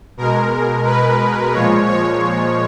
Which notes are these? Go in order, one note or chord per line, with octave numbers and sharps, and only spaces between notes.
B2 G#3 A#4
B4
A#2 F3 G#3 C#5
C#5